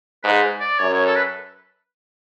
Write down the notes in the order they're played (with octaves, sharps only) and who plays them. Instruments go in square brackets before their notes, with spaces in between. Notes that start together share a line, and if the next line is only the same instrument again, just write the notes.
[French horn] G#2 [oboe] B4
[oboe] D5
[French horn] F#2 [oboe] C#5
[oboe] C#5
A4
B4